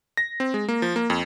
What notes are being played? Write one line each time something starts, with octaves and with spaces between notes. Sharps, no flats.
A#6
C4
G#3
A#3
F3
A#3
F2